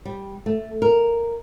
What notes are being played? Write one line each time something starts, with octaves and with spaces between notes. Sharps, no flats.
G3
A3
A#4